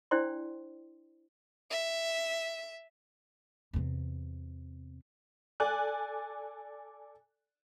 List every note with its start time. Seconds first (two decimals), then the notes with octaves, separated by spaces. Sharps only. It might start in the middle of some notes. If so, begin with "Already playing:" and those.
0.11 D4 E4 C5 D5 G5 C6
1.71 E5
3.73 E2 C3
5.60 A4 D5 G#5 F#6